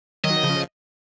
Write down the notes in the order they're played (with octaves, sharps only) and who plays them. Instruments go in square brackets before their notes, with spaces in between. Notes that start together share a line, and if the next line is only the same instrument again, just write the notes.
[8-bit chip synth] D#3 F#3 [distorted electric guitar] D#5
[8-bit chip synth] C#3 F3